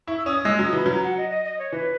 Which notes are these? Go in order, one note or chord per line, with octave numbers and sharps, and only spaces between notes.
E4 C#6
E6
C#4 D#6
G#3 E6
F#3 D#6
E3 B5
F#3 A#5
F#5
D#5
D#5
D#5
C#5
E3 B4